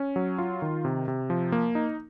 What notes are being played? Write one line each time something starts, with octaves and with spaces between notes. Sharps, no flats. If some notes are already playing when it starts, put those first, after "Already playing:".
Already playing: C#4
F#3
F4
D#3
C3
C3
F3
A#3
D#4